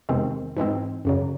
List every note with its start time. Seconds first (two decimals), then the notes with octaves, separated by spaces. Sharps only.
0.09 E2 C3 D#3 G#3 C4
0.57 G#2 E3 G#3 C4
1.05 F#2 C#3 F#3